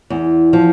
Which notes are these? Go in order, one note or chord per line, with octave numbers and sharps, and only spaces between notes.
E2
F3